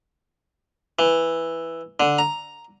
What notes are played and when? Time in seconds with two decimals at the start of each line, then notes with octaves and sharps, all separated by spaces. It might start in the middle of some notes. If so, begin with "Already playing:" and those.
0.99 E3
2.00 D3
2.18 A#5